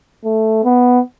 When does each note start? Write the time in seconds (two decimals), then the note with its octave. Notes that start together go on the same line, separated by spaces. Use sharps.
0.25 A3
0.64 B3